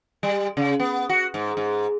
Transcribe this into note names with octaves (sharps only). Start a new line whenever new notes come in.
G3
C#3
B3
F#4
G#2
G#2